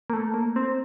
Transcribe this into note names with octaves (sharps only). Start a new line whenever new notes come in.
A#3
A3
A#3
C4